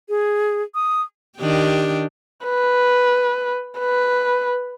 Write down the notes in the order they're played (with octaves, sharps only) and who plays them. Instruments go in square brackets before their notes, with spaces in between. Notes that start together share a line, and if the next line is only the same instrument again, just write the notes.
[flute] G#4
D#6
[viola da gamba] D#3 D4 G4
[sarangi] B4
B4